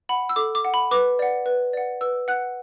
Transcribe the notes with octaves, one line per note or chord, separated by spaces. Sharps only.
F#5 B5
E6
A4 D6
D6
F#5
B5
B4 D6
D5 F#5
B4
D5 F#5
B4 E6
F#5 F#6